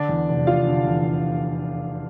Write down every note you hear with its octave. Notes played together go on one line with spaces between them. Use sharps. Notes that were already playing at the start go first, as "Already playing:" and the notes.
Already playing: D3 D4 D5
E2
F1
F1 F4 F5
D3
E2